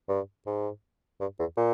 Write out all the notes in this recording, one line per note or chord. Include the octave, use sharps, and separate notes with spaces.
G2
G#2
G2
E2
A#2